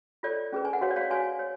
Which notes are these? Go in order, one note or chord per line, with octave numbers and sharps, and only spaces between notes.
F4 A4 C#5 D5
C#4 G#4 B4
G#5
F#5
F#4 B4 C#5 F5
D5
C#5 F5
F#4 C#5 F5 G#5
C#5